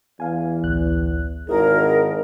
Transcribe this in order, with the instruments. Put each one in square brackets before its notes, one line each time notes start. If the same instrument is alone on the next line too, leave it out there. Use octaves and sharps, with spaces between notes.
[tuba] E2 [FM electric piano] F5 G#5
[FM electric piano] A1 D2 F#6
[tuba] G#1 [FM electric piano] E4 F#4 [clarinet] G#4 [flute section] A#4